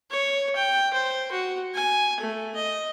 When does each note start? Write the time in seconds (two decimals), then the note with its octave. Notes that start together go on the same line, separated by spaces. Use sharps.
0.10 C#5
0.56 G5
0.93 C5
1.31 F#4
1.74 G#5
2.20 A3
2.55 D#5